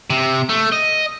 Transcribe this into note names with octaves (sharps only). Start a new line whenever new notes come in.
C3
A3
D#5